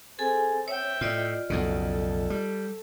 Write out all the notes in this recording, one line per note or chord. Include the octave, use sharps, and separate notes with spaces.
C4 G#4 A4 G#5
C#5 E5 G5
A2 F4 D5 D#5
B1 F2 C#3 A4
A4
G3